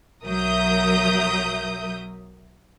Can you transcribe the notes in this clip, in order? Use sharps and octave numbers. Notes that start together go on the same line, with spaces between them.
B1 F#3 A#4 E5 D#6 G6